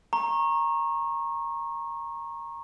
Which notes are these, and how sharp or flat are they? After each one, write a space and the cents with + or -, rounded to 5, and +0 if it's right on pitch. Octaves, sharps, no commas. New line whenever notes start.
A#5 +0 C#6 -25